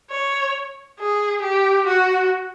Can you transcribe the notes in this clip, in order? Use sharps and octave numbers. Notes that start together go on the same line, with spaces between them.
C#5
G#4
G4
F#4